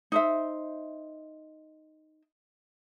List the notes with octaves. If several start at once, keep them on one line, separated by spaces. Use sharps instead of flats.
D#4 C5 E5